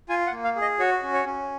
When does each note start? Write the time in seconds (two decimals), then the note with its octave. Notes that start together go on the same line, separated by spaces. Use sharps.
0.09 F4 G#5
0.27 F#5
0.32 A#3
0.44 F5
0.56 G#4
0.61 D#5
0.79 F#4 C#5
1.03 C#4
1.14 C#5
1.26 C#4